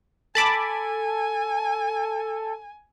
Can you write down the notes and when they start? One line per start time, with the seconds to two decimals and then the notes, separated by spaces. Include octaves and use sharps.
0.35 A4 G#5 A5 B5 D6